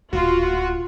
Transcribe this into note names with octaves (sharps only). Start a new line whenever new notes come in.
D1 A#2 F4 F#4